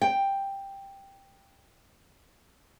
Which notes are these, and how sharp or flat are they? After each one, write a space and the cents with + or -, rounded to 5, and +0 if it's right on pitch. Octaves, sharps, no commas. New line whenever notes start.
G5 +5